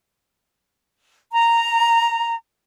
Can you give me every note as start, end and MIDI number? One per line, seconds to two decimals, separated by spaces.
1.32 2.34 82